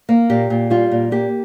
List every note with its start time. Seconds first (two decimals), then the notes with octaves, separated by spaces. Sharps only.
0.09 A#3
0.30 A#2 G4
0.50 A#2
0.70 G3 F4
0.91 A#2
1.11 A#3 G4